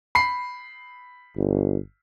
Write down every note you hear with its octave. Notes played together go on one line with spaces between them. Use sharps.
B5 C7
G1